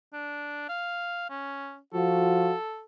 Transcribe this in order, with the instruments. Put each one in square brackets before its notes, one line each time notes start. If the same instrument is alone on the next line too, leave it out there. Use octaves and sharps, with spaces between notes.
[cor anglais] D4
F5
C#4
[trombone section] F3 F4 F#4 [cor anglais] A4